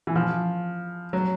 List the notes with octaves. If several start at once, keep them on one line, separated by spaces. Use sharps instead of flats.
E3
F3
F#3